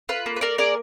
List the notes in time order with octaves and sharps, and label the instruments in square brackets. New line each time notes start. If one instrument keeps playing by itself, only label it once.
[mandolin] F4 B4
A#3
B4
A#3 A#4 D5
G#4 A#4 D5